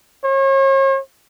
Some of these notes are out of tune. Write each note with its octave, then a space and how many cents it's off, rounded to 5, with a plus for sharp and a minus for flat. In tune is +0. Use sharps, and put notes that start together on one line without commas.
C#5 -40